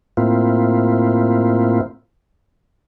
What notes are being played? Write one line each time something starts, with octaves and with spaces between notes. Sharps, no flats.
A2 A#3 C4 E4 F4